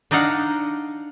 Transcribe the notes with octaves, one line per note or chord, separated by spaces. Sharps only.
D4 D#4 D#5 F5 F#5